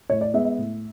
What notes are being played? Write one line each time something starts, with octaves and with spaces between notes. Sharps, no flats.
A2 C#5
D5
G#3 B3 E5
E5
A2